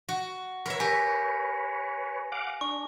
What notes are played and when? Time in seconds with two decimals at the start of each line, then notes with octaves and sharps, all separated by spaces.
0.09 F#4
0.66 A#4 B4 C#5 E5
0.80 G4 G#5 A#6
2.32 F5 F#5 D6
2.61 D4 C#6